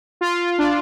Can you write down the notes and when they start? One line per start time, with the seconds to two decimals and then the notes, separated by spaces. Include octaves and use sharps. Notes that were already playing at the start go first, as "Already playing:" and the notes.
0.21 F4
0.58 D4